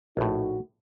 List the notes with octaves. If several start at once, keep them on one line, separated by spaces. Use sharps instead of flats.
A#1 A2 D#4 F#4 A4